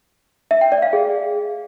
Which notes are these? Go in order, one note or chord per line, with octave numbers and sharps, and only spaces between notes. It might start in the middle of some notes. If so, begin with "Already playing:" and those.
E5
G5
D5
F5
G#4